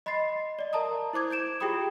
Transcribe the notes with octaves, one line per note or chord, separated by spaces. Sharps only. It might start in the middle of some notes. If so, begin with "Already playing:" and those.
D#5 B5 C6 A6 C7
D5 D#5
A#4 E5 A5 A#5 D#6
E4 C5 D6 G#6
G6 G#6 D7 E7
F4 G4 G#4 G5 B5 D#6